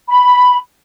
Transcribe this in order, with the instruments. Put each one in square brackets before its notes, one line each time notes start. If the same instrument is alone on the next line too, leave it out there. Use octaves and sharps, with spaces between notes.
[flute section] B5